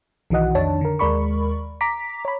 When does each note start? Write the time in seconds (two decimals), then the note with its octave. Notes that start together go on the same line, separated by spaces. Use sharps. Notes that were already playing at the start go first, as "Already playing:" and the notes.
0.30 B1 D#3 E3 F#4 D#5 F#5
0.55 F2 D#3 D4 C#5 A5
0.81 D3 A#4
0.99 D#2 G#3 A#4 D5 B5 C#6
1.81 A#5 D6 B6
2.25 C#5 B5